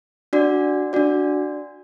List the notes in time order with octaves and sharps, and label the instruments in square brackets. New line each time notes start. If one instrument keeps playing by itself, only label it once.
[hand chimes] D4 F#4 D5
D4 F#4 D5